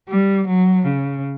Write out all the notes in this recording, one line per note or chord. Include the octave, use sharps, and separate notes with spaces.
G3
F#3
C#3